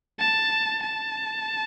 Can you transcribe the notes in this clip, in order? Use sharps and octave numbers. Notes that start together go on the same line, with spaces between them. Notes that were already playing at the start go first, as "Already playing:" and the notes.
A5
A5